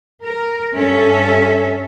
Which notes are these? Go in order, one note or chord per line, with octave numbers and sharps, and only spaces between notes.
A#4
G2 C#4 A4 E5